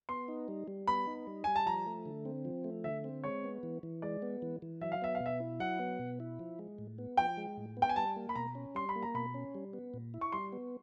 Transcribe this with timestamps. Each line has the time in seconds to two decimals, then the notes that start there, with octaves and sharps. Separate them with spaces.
0.09 B3 C6
0.28 D#4
0.48 G3
0.68 G3
0.87 B3 B5
1.07 D#4
1.27 G3
1.44 G3 G#5
1.56 A5
1.66 F3 A#5
1.86 A3
2.06 D3
2.25 C4
2.45 F3
2.64 A3
2.84 D3 E5
3.04 C4
3.24 G#3 C#5
3.44 B3
3.63 E3
3.83 E3
4.02 G#3 D5
4.22 B3
4.42 E3
4.62 E3
4.81 F#3 E5
4.92 F5
5.02 B3 E5
5.15 F5
5.20 B2
5.26 E5
5.40 E4
5.60 F#3 F#5
5.79 B3
5.99 B2
6.20 E4
6.39 F3
6.59 G#3
6.78 A2
6.98 B3
7.17 F3 G5
7.37 G#3
7.57 A2
7.77 B3
7.82 G5
7.89 G#5
7.96 G3 A5
8.16 A#3
8.29 B5
8.35 B2 A#5
8.55 C#4
8.75 G3 C6
8.89 B5
8.96 A#3
9.02 A#5
9.14 B2 B5
9.34 C#4
9.55 G3
9.73 B3
9.94 A#2
10.14 E4
10.21 C#6
10.32 G3 C6
10.52 B3